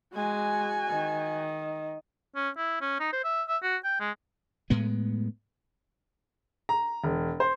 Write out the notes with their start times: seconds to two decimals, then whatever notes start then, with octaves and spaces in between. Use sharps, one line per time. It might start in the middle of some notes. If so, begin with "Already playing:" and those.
0.14 G#3 F#4 G#5
0.90 D#3
2.36 C#4
2.57 E4
2.81 C#4
3.00 D#4
3.13 C5
3.24 E5
3.48 E5
3.63 F#4
3.85 G5
4.00 G#3
4.70 A2 G#3 B3
6.69 A#5
7.04 E1
7.40 C5